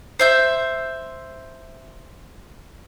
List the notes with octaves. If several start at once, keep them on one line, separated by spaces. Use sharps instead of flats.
C5 E5 G6